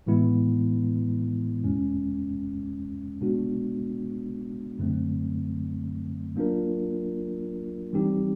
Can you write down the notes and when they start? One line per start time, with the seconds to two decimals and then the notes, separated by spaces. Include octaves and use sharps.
0.06 A2 E3 G#3 B3 E4
1.64 E2 B2 G#3 C#4
3.21 B2 G#3 B3 D4 F#4
4.78 F#2 D3 F#3 A3 C4
6.36 F#3 A#3 D4 F4 A#4
7.93 E3 G3 C4 D#4 G4